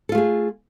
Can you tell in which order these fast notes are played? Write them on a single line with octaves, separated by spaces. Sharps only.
A4 F4 A3 G#4